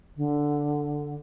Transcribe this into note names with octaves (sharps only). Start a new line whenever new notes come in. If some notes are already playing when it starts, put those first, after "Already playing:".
D3